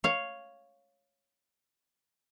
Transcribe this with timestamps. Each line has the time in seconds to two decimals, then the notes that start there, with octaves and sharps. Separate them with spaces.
0.04 C#5 F5